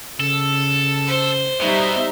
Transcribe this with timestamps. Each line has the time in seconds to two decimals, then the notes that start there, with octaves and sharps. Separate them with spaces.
0.20 C#3 A4
1.07 C5
1.62 B2 G3 D#4 E5